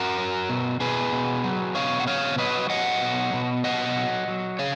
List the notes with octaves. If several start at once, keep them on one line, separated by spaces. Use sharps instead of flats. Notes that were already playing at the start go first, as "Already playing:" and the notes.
Already playing: F#4 A#4
F#3
B2
B2 G#4 B4
B2
F#3
B2 C#5 F5
F#5
F#3 C#5 F5
F#3 B4 D#5
F#3 D#5 F#5
B2
B2
F#3 D#5 F#5
F#3
F#3
C#3 C#5 F5